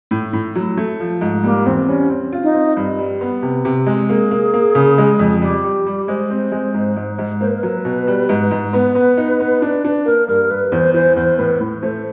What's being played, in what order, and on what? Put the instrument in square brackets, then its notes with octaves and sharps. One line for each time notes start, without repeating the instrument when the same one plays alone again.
[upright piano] A2
A2
F#3
A3
F3
G#2
[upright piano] G3 [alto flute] A#3
[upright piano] E2 [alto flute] C4
[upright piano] G3 [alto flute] C#4
[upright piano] C4
F4
[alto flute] D#4
[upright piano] C4
G2
G3
B3
C3
C3
G#3
[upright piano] A#3 [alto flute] G#4
[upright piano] A#3
A#3
C#3
G#3
F2
[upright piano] G3 [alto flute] G4
[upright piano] G3
G3
[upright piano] G#3 [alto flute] C5
[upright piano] C4
G#3
G#2
G#2
G#2
[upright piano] A#3 [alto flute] C5
[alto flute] B4
A#4
[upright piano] F#3 [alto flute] B4
[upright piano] B2
G3
G#2
G#2
[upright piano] B3 [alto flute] B4
[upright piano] B3
D#4
B3
D4
D4
[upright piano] A#3 [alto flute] A#4
[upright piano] G2 [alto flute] A#4
[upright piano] G2 [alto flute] B4
[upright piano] E2 [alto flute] C5
[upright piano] E3 [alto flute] C5
[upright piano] E2 [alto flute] C5
[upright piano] A2 [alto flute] B4
[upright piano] A2
[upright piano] A3 [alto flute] C5